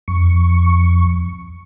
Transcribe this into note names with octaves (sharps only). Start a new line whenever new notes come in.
F2 C#6